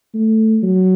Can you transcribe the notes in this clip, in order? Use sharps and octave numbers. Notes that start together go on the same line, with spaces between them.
A3
F#3